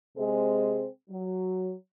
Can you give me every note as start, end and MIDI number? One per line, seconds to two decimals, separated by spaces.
0.17 0.86 48
0.17 0.86 56
0.17 0.86 60
0.17 0.86 68
1.10 1.72 54